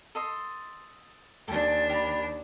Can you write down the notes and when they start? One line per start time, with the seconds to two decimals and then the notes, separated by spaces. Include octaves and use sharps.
0.15 A4 D#5 C6
1.48 D#2 D4 A4 G5 G#5
1.90 G4 B5